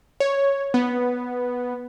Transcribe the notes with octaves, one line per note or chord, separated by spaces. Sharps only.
C#5
B3